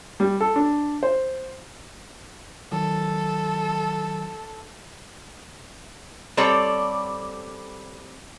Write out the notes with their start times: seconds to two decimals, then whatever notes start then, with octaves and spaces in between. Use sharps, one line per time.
0.20 G3
0.41 A4
0.56 D4
1.03 C5
2.72 D#3 F#3 A4
6.37 G3 C4 A4 C#5 D5